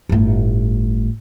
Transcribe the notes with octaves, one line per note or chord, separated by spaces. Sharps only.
G1 A2